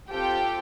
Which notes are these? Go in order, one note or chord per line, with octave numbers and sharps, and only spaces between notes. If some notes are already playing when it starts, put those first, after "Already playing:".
C4 F4 G4 A4 G5